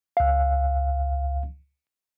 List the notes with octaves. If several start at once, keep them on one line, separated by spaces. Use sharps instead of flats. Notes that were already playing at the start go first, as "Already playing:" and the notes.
C#2 F5